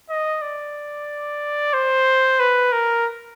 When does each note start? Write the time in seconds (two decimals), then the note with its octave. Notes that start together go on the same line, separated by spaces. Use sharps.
0.10 D#5
0.42 D5
1.74 C5
2.40 B4
2.73 A#4